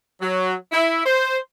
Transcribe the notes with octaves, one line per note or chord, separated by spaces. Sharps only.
F#3
E4
C5